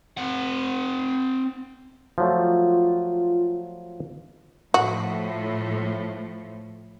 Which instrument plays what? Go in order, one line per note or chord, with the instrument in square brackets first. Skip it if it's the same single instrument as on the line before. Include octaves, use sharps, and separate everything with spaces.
[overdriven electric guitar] C4 F#5
[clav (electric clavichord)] F3 F#3 A3 [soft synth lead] F4
[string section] A2 F3 [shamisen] F#4